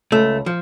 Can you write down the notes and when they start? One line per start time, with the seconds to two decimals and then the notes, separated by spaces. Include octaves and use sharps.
0.12 C#2 A3
0.46 F3